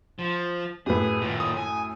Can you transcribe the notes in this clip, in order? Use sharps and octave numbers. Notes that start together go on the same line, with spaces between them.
F3
F#2 A2 G4 G#4 B4
D#2 A#2
D#6
G#5